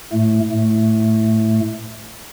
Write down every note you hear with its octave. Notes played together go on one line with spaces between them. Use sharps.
A2 A3
A2 A3